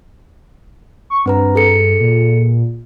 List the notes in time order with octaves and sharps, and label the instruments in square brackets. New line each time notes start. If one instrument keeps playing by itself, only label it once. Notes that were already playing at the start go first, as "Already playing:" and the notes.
[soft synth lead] C#6
[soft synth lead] G2 [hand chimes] C4 B4 A#5
[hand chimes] G#4 A4 C#7
[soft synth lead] A#2